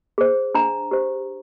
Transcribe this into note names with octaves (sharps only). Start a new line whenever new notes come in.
G#4 C5
D4 A#5
G4 C5